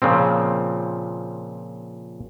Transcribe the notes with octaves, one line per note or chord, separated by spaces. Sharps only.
A#2 C#3 F3 C4